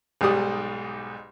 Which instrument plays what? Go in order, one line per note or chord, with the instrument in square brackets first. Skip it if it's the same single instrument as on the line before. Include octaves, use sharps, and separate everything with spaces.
[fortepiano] B1 G#2 G3 G4 D5 D#6